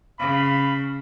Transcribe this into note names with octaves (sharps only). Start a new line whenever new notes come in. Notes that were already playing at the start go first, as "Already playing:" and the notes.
C#3 F5 B5